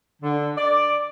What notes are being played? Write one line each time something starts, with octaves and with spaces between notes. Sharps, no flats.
D3
D5